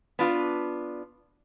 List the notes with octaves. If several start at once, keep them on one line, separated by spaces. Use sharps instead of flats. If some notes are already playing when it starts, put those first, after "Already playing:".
B3 D4 F4